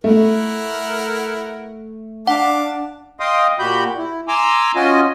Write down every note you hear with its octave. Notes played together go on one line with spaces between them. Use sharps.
A3 E4 A#4 F#5
D4 F5 F#5 A5 D6
D#5 F5 G5 C6 D#6
A#2 F#4 G4 B5 G6
E4
G#5 A#5 C6 D6 E6
C#4 F4 F#4 D#5 G#5